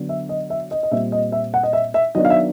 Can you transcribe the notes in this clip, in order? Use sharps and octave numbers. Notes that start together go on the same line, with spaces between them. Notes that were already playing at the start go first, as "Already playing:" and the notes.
Already playing: D3 F#3 B3 D4
E5
D#5
E5
D#5
D#5
A#2 G3 C4 E5
D#5
E5
F#5
D#5
E5
E5
D#3 F#3 B3 D4 D#5
F5
E5